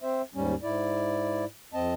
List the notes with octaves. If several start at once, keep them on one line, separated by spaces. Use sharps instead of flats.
C4 C5 E5
D#2 G#2 G3 C#4
G#2 E4 D5
F2 C4 D#5 A5